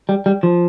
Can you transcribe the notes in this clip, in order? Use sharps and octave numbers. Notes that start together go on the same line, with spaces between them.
G3
G3
F3